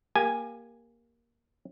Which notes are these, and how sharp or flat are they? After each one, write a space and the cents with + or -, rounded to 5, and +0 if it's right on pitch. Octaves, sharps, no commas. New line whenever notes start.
A#3 +5 G4 +25 G#5 +0